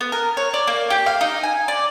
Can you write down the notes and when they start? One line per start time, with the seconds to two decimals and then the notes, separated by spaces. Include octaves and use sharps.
0.01 B3
0.12 A#4
0.37 C#5
0.54 D5
0.67 A#3
0.90 G4
1.06 F5
1.21 D#4
1.43 G#5
1.68 D5